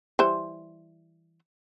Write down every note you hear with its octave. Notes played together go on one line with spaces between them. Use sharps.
E3 G3 C5